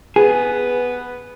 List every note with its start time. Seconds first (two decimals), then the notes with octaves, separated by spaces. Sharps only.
0.16 B3 G#4